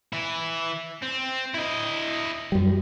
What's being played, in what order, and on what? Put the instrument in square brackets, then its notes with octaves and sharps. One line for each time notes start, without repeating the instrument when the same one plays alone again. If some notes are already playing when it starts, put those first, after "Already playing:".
[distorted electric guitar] E3 E4
C4
E4 D#5
[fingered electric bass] F#2 G3